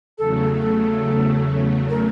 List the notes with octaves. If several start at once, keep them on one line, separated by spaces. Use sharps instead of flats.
E2 C#3 F#3 A3 A4
A4
A#4